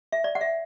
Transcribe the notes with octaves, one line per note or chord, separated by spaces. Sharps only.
E5
D5
F#5
E5